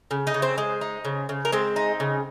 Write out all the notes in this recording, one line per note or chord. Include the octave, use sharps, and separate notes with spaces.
C#3
D#4 D#5
C#3
C4 C5
G#3
D#4
C#3
C#3
A#4
G#3 C4 C5
D#4
C#3